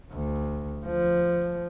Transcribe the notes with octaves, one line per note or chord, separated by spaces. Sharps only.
D2
F3